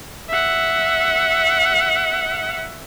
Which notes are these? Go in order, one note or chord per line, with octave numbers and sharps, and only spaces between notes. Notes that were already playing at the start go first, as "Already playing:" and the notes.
E5 F#5